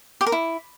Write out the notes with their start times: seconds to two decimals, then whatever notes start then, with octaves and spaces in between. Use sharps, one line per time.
0.21 G4
0.26 A#4
0.32 E4